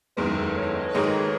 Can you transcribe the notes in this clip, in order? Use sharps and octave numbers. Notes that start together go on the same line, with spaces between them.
F#1 E2 D#3 G#3 B4
A4
C#5
D#5
B4
G#1 G#2 D#3 G#3 D#4 C#5